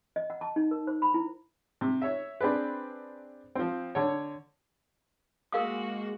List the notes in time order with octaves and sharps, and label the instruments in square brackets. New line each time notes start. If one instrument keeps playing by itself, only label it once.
[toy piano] D#5
F#5
A5
D#4
A#4
C5
B5
E4
[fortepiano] C3
C#5 E5
C4 D4 G#4 B4
F3 C4
D3 C#5
[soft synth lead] G#3 [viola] A#3 F#4 [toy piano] A#4 F5 D#6